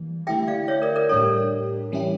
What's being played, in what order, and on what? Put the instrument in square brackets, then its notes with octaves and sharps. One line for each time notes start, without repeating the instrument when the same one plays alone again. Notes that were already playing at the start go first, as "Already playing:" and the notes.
Already playing: [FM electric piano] E3 G3 A#3
[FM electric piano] D3 A3 E4 G4 [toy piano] E5 G5
[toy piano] D5 F5
C#5 E5
A#4 D5
A#4 D5
[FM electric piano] A2 G3 D4 G4 [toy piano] A4 C#5
[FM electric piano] E3 G3 C#4 E4 G4